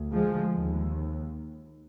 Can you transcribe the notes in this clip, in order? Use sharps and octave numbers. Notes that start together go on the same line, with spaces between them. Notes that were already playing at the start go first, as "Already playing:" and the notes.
Already playing: D2
F3 G#3
D#2